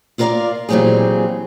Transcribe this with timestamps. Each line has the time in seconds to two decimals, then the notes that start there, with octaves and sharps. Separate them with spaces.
0.18 E4 F4 A#4 C#5 D5 F5
0.69 A#2 E3 F#3 C4 G4 G#4